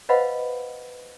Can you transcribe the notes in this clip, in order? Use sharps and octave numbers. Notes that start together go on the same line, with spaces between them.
B4 C5 D#5 F5 F#5 B5